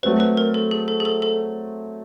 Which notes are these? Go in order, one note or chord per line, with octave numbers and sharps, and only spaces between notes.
F#3 A3 C4 B4
B4
A#4
A4
G#4
A4
G#4
A4
A4